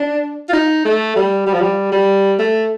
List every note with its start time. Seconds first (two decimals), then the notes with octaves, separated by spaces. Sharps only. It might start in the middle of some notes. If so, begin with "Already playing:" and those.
Already playing: D4
0.49 F4
0.53 D#4
0.85 A3
1.16 G3
1.47 G3
1.53 F3
1.61 G3
1.92 G3
2.39 A3